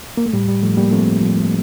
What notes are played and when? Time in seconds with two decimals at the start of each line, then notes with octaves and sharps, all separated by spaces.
0.17 A#3
0.26 A3
0.33 A2 G3
0.48 G3
0.63 A2 F3 A3
0.77 G3 A#3
0.92 F3 A3 C4
1.21 F3